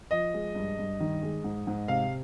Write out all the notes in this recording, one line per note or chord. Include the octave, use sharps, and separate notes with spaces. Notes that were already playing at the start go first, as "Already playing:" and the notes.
F3 D#5
G#3
G2
G2
D#3
G#3
G#2
G#2
C3 F5